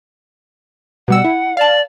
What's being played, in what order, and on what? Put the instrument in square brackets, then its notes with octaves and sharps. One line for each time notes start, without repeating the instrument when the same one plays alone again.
[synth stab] B2 G3 E6 [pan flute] F#5
[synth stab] E4
[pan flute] D5 [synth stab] F5 A5